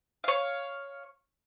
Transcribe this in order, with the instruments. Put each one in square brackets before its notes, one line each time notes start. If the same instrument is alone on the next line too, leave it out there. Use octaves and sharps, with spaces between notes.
[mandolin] C#5 F5